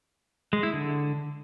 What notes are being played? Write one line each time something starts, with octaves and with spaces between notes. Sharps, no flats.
G#3
E4
D3